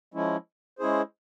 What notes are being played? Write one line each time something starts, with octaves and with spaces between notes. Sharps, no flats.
F3 G#3 C#4 E4
G#3 C#4 E4 G#4 C5